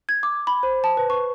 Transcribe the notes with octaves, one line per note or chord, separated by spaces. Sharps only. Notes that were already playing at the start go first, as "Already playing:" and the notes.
G#6
D6
B5
C5
A5
B4
C#6